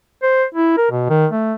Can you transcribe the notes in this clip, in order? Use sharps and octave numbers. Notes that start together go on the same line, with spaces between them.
C5
E4
A#4
B2
D#3
A3